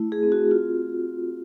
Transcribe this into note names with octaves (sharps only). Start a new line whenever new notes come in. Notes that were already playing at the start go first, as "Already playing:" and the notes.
Already playing: A3 E4
G#4
C4
F#4
F4